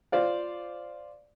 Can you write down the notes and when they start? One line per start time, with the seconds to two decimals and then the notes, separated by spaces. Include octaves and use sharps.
0.12 F4 C5 D5 F5